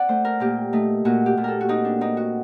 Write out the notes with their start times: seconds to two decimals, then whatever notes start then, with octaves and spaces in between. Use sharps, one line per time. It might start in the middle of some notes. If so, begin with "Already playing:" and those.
Already playing: C4 D5 F#5
0.09 A3 C5
0.25 A#4
0.40 A#2 G4
0.73 A3 D#4
1.05 A#2 F#4
1.26 G4
1.37 A#2
1.44 A4 A#4
1.61 F#4
1.69 C4 D#4
1.85 D4
2.01 C4 D#4
2.17 F#4